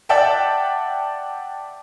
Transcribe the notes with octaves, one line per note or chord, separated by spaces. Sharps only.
D5 E5 F#5 G5 A5